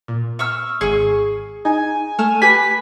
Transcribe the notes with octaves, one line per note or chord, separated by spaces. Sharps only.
A#2
C#6 E6 F6
G#1 G#4 C#6 G#6
D#4 G#5
A3 F6 E7
G4 B4 G#5 B6